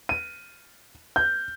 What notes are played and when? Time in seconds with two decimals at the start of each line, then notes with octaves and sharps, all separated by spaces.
0.09 D#7
1.16 G6